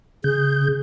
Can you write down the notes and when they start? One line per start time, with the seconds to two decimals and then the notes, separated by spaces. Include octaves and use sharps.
0.24 C#3 G#4 G6